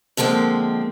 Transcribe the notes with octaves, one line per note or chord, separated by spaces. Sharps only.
D3 F3 G#3 A#3 C4